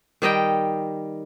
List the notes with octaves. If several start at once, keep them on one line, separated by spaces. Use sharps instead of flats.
D#3 G3 D#5 G5